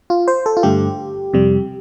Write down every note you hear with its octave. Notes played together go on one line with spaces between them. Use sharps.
F4
C5
A4
F4
G2 D3 A3 G4
F2 C3 G3